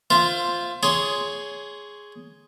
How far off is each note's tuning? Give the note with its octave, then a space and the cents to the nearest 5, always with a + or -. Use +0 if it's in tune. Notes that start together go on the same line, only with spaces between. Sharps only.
F4 +0 C5 +0 E5 +30
G#4 +0 C#5 +15 C6 +0